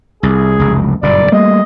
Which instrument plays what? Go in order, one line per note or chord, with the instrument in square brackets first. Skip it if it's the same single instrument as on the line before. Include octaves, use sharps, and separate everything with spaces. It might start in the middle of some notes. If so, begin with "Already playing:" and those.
[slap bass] C2 [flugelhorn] G#4
[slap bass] F1 C#2 F#2
[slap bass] F#1 G2 A#2 [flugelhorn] D5
[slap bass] G3 A3 A#3 [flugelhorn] D#5